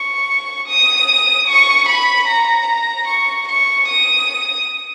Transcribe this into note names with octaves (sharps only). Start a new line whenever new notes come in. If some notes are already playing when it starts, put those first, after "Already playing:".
Already playing: C#6
D#6
C#6
B5
A#5
A#5
C#6
C#6
D#6